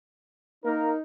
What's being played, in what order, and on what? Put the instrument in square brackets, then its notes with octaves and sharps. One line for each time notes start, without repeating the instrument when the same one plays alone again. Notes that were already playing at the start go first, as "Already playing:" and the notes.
[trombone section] A#3 A#4 [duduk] D#4